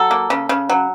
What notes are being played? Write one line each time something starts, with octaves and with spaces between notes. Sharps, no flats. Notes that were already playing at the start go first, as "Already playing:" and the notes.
Already playing: F#3 A4
A#3
C#3
C#3
F#3